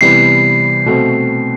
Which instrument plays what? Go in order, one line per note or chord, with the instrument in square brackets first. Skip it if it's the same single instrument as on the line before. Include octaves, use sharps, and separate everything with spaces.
[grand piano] C3 E3 G3 B3 [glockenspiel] C7
[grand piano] B2 A3 C4 F#4